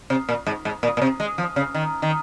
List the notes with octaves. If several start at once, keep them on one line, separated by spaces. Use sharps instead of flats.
C3
A#2
G#2
G#2
A#2
A#2
C3
G#3
F3
C#3
D#3
D#3